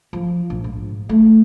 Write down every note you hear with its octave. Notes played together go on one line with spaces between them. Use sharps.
F3
A#1
G#2
A3